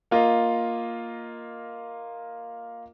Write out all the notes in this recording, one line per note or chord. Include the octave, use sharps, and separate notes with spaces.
A#3 F4 A#4 D#5